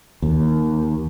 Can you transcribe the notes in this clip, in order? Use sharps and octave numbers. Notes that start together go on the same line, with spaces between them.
D#2